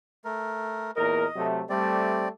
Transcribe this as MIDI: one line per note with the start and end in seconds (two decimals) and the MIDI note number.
0.25 0.91 57
0.25 0.91 70
0.96 1.24 40
0.96 1.24 46
0.96 1.24 70
0.96 1.47 75
1.36 1.61 48
1.36 1.61 54
1.36 1.61 57
1.69 2.26 55
1.69 2.26 57
1.69 2.28 60
1.69 2.28 74